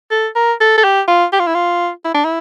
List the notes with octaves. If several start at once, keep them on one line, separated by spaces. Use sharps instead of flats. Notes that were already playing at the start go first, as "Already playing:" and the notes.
A4
A#4
A4
A4
G4
F4
G4
F4
E4
F4
E4
D4
E4